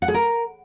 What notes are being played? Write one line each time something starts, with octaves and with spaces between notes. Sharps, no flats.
F#5
G#4
A#4